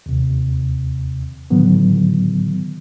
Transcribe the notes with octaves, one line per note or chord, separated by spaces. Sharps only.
D#2 C3
A2 D3 D#3 F#3 B3